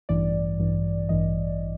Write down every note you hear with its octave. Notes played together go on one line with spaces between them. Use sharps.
A1 G2 E3 D5
A1 G2 E3
A1 G2 E3 D#5